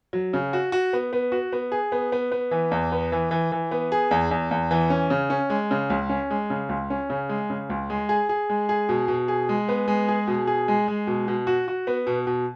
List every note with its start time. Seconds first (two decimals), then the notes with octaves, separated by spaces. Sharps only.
0.13 F#3
0.33 C#3
0.53 F#4
0.72 F#4
0.93 B3
1.13 B3
1.32 F#4
1.52 B3
1.72 G#4
1.92 B3
2.12 B3
2.32 B3
2.51 E3
2.71 E2
2.92 B3
3.12 E3
3.31 E3
3.52 E3
3.71 B3
3.92 G#4
4.11 E2
4.31 E2
4.51 E2
4.71 E3
4.90 C#4
5.10 C#3
5.30 C#4
5.50 G#3
5.71 C#3
5.90 C#2
6.09 C#4
6.30 G#3
6.50 C#3
6.69 C#2
6.90 C#4
7.10 C#3
7.29 G#3
7.50 C#3
7.70 C#2
7.90 G#3
8.09 G#4
8.29 G#4
8.50 G#3
8.69 G#4
8.89 B2
9.08 B2
9.28 G#4
9.49 G#3
9.69 B3
9.88 G#3
10.08 G#4
10.28 B2
10.47 G#4
10.68 G#3
10.88 G#3
11.07 B2
11.28 B2
11.47 F#4
11.68 F#4
11.87 B3
12.07 B2
12.27 B2